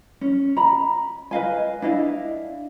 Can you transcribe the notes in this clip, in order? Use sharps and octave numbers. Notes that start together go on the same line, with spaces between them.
C#4
A#5 B5
B4 D#5 F5 G#5
D4 E4 D#5 F5